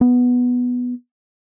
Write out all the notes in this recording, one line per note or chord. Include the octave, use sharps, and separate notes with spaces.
B3